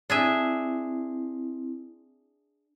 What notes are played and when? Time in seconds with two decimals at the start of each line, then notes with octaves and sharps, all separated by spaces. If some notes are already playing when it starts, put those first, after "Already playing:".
0.10 C4 D4 E4 G#4 E5